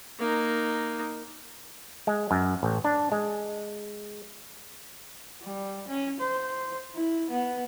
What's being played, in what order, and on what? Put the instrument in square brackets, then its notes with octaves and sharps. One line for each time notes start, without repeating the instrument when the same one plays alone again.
[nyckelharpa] A#3 D#4
[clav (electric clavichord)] G#3
F#2
A1
D4
G#3
[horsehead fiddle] G3
C#4
C5
E4
B3